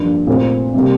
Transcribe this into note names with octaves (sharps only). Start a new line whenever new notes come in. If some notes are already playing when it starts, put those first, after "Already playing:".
Already playing: G2 F3 A#3 D4
A#2 A3 C4
C3 G3 A#3